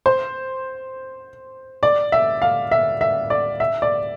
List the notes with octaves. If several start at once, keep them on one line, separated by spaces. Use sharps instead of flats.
C5
D5
E5
F5
E5
E5
D5
E5
D5